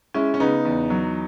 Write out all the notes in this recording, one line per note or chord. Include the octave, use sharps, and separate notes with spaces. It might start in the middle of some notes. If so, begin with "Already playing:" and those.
G#3 C#4 E4
C#4
C#3 B3 D#4
E2
F#3